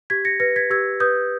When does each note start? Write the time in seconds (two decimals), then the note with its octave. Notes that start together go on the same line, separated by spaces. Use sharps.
0.10 G4 G#6 B6
0.25 A#6 C#7
0.40 B4 A#6 C#7
0.56 G#6 B6
0.70 G4 E6 G#6
1.00 B4 D#6 G6